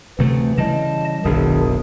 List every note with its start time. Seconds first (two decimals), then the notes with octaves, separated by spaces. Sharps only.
0.19 D2 C3 E3 A3
0.58 C#3 E3 G3 D#5 A5
1.25 F#1 B1 D#3 D4 G#4